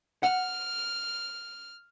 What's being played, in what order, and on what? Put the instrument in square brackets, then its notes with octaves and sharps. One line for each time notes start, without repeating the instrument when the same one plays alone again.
[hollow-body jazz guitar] F#5 [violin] F6